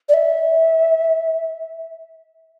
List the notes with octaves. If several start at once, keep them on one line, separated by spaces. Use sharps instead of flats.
D5
E5